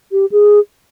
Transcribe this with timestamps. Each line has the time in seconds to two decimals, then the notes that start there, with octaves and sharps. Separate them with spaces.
0.12 G4
0.32 G#4